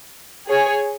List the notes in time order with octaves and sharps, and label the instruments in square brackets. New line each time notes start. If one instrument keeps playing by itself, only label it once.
[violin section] G#4 C#5 G#5